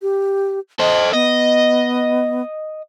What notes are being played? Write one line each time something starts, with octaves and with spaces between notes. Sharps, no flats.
G4
A4 C5 D#5
B3 D#5